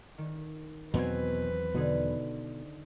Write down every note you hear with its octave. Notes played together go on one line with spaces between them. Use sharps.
D#3
E2 B2 F#3 C4 B4 C5 G#5
B2 D3 D#4 G#4